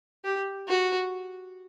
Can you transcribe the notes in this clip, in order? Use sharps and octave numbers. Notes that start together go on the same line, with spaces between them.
G4
F#4